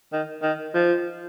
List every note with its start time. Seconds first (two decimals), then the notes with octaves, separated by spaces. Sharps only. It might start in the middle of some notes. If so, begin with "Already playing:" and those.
0.13 D#3
0.43 D#3
0.75 F3